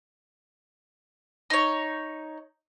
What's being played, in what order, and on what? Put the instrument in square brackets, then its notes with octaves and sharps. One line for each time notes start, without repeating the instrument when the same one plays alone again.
[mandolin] D#4 C#5